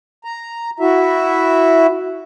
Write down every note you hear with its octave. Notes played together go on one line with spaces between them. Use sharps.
A#5
E4 F#4 E5